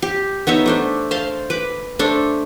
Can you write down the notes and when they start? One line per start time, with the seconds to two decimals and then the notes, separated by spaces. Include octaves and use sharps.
0.02 G4
0.47 B3 D#4 C#5 E5
0.66 A3 D4 C5
1.11 C5 F5 A5 C6
1.50 B4 D6
1.99 A3 D4 A4 C5